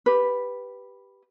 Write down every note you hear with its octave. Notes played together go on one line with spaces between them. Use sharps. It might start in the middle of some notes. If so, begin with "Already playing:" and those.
G4 B4